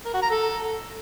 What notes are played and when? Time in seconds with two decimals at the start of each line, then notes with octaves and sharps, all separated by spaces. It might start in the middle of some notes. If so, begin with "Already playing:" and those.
0.05 A#4
0.14 F#4
0.22 A#5
0.31 A4